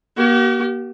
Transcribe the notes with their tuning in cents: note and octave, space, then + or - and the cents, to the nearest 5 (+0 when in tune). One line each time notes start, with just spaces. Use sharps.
A#3 +35 G4 -45